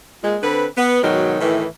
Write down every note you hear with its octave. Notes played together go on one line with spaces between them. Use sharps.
A#2 G#3
D3 C4 B4
B3
G#2 B2 D#3 F#3
A2 D#3 E3